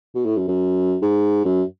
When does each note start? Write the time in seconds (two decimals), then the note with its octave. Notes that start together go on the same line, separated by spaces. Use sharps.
0.15 B2
0.26 A2
0.37 F#2
0.48 F#2
1.02 G#2
1.45 F#2